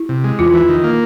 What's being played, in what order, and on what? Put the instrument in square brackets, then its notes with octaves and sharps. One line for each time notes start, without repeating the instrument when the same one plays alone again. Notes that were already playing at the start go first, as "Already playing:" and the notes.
Already playing: [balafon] E4
[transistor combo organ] C3
G#3
[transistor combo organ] E2 [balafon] F4
[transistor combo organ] E3
D#3
A#3